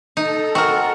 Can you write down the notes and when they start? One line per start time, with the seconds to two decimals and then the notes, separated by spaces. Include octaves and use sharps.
0.17 D#4 A4
0.55 C4 F#4 A#4